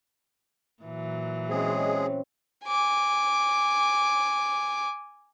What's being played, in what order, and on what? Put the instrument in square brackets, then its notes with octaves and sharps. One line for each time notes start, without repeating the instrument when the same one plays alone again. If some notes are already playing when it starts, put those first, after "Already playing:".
[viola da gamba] A#2 E3 F#3
[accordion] G#3 G#4 [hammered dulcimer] C4 C#4
[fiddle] G#5 D6